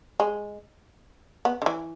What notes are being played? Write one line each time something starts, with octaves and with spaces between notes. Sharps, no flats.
G#3
B3
D3
E3